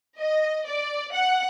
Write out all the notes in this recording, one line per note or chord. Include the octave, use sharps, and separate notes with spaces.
D#5
D5
F#5